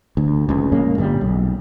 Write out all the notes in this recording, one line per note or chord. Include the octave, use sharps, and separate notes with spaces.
D2
F1 C#2
A#2 G#3 A#3 C#4
G1 A#2 D3 G3
B1